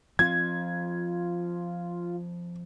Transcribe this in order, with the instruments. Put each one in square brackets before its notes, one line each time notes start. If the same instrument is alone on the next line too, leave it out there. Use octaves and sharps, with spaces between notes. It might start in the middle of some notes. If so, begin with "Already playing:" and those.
[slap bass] F3 C4 [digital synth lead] F4 [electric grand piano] G#6